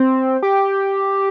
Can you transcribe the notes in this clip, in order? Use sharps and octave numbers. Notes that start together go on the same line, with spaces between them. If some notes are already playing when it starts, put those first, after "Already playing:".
Already playing: C4
G4